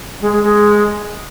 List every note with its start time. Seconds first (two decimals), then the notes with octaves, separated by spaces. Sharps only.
0.21 G#3
0.32 G#3
0.43 G#3